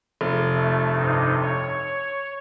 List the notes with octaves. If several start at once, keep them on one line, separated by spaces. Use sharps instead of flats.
F1
A3
G2 C3 D#4
C#5